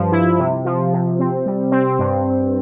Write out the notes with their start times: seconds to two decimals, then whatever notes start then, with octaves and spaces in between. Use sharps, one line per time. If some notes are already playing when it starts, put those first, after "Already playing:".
Already playing: G2 F3
0.12 E4
0.39 C3
0.65 F3
0.93 C3
1.19 C4
1.46 G3
1.72 C4
1.99 G2